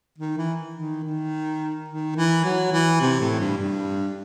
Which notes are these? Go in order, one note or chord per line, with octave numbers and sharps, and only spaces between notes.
D#3
E3
D#3
D#3
D#3
E3
F#3
E3
C3
A2
G2
G2